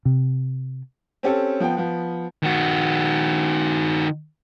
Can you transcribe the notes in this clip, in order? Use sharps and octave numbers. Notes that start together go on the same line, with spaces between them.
C3
C4 C#4 G4 A4
F3 B3 G5
F3 B3
D#3 F#4